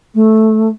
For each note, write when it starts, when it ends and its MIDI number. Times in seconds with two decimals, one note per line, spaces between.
0.14 0.68 57